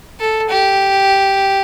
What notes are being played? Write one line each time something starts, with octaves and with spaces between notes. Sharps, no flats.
A4
G4